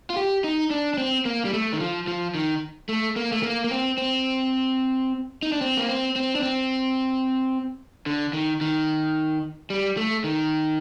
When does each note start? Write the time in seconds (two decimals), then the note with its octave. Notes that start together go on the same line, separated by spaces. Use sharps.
0.10 F4
0.17 G4
0.44 D#4
0.70 D4
0.94 D4
0.98 C4
1.25 A#3
1.45 G3
1.53 A3
1.73 D#3
1.80 F3
2.08 F3
2.35 D#3
2.89 A3
3.16 A#3
3.32 A3
3.43 A#3
3.64 A#3
3.71 C4
3.98 C4
5.43 D#4
5.52 D4
5.61 C4
5.77 A#3
5.89 C4
6.16 C4
6.35 D4
6.43 C4
8.06 D3
8.33 D#3
8.61 D#3
9.70 G3
9.97 A3
10.24 D#3